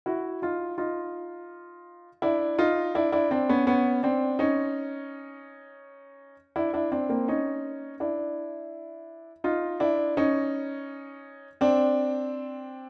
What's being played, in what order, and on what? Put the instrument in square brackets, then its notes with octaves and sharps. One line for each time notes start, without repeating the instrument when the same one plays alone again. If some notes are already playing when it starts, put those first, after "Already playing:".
[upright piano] E4 F#4
D#4 F4
D#4 F4
D4 E4
D#4 F4
D4 E4
D4 E4
C4 D4
B3 C#4
B3 C#4
C4 D4
C#4 D#4
D4 E4
D4 E4
C4 D4
A#3 C4
C#4 D#4
D4 E4
D#4 F4
D4 E4
C#4 D#4
C4 D4